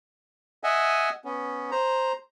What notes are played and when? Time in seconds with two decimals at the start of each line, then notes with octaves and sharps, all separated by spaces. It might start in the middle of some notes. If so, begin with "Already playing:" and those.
0.64 D#5 E5 F#5 G#5
1.25 B3 C#4
1.71 C5 A#5